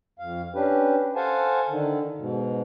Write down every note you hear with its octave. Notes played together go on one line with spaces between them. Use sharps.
F2 F5
C#4 D4 G4 B4
A4 C5 F5 F#5 G#5 A5
D3 D#3
G#2 B2